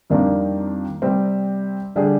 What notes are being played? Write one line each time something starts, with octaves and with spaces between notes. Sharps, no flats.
F2 D#3 G3 A#3 D4
C3 G3 C4
D3 G3 D4 G#4